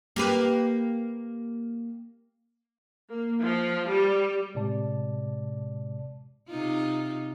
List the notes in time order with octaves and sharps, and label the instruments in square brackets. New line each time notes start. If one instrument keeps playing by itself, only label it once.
[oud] A#3 G4 B4
[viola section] A#3
F3
G3
[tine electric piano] A2 C3 G#3 D5 A5
[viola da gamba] C3 D#4 F4